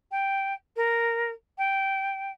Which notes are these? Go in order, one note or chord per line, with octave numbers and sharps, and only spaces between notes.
G5
A#4
G5